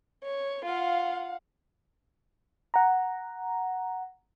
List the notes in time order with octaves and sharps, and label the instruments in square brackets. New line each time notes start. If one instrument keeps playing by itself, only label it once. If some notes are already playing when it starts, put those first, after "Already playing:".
[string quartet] C#5
[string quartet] F4 [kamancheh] F5 F#5
[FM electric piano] F#5 A#5